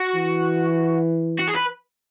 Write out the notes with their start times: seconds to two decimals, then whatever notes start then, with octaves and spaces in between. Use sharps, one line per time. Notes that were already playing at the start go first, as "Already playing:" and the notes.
Already playing: F#4
0.15 E3
1.39 F#4
1.48 G#4
1.56 B4